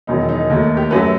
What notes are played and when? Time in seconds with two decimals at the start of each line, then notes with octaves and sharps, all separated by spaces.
0.07 E1 E2 D#3 F#3 D#4
0.29 D#4
0.50 D#2 D#3 A3
0.77 G4
0.90 F#2 F#3 A3 B4